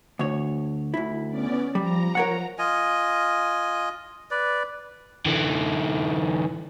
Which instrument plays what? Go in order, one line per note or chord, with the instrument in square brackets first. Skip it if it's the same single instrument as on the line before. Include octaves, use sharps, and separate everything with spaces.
[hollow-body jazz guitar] D2 C#5
D2 E4
[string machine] B3 C#4 D5
[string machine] F3 A#5 [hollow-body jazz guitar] G3
[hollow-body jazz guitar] A#4 C#5 F#5
[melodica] F4 D#5 G#5
B4 D5
[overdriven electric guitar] D3 E3